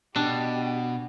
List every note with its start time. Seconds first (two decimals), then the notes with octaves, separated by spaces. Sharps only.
0.16 B2 D4 G4